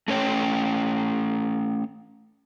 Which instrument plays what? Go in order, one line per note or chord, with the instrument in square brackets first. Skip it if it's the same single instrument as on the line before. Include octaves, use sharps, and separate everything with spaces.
[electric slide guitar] A3 C#4 C#5 G5